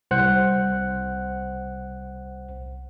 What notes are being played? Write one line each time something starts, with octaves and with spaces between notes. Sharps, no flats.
C2 C5 F#5 F#6